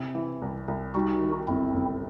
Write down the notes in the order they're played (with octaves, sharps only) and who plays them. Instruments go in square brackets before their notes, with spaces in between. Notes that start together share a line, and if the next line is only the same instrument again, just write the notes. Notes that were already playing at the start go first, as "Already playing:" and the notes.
Already playing: [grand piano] C3 E4
E3
C2
C2
[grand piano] G3 [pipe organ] D#4 F#4
[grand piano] D#3
[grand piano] G1 [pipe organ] C4 E4
[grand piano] G1